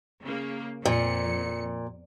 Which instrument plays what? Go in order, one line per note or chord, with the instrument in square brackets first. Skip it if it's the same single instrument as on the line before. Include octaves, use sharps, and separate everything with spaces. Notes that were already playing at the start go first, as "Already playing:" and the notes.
[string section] C#3 A#3
[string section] F2 C#7 [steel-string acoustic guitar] A#2